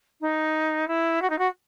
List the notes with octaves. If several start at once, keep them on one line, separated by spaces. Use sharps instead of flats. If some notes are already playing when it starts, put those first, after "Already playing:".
D#4
E4
F#4
D#4
F#4